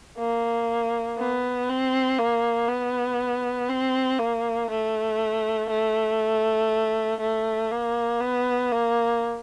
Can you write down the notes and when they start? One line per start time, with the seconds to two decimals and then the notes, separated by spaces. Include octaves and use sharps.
0.18 A#3
1.18 B3
1.69 C4
2.18 A#3
2.68 B3
3.69 C4
4.19 A#3
4.70 A3
5.70 A3
7.20 A3
7.71 A#3
8.21 B3
8.72 A#3